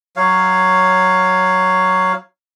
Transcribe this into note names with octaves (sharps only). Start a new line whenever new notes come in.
F#3 C#5 F5